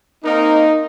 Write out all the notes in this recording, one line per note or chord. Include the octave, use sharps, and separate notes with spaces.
A#3 C4 D#4 A#4